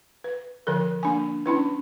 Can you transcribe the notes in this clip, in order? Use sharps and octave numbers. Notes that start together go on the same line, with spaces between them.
B4
D3 F3 A4 A#4
A#3 D4 G#5
C#4 D4 E4 B4